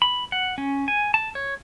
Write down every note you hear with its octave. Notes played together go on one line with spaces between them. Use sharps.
B5
F#5
C#4
G#5
A5
C#5